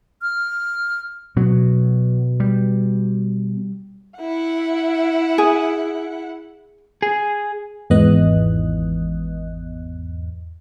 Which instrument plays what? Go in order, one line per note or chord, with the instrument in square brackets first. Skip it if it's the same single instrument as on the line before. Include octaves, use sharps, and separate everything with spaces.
[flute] F6
[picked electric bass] B2 [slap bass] F#3
[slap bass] G3
[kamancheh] E4 F#5
[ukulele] G#4
[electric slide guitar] G#4
[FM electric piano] G#1 E2 G#2 B3 D#5 F#6